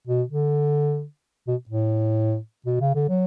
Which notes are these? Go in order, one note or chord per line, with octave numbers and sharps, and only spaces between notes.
B2
D3
B2
A2
B2
C#3
D3
F#3